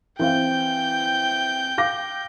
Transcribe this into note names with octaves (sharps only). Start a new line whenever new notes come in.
E3 C4 F5 G5 G6
F5 D6 A#6